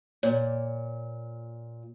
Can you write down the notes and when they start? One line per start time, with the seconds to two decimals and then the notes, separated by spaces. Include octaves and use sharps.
0.23 A#2 C#5